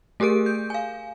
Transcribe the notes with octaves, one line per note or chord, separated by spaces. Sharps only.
A3 G4 G#4 A#4 D7
G6
F5 G#5